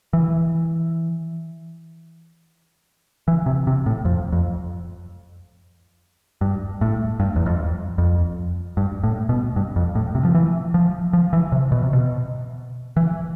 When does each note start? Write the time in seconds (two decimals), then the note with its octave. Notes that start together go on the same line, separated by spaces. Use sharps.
0.13 E3
3.28 E3
3.46 C3
3.67 C3
3.86 A2
4.05 F2
4.32 F2
6.41 G2
6.81 A2
7.20 G2
7.36 E2
7.46 F2
7.98 F2
8.77 G2
9.04 A2
9.29 B2
9.56 G2
9.76 F2
9.95 A2
10.15 C3
10.25 F3
10.34 E3
10.74 F3
11.13 F3
11.33 E3
11.52 C3
11.72 B2
11.83 C3
11.93 B2
12.97 E3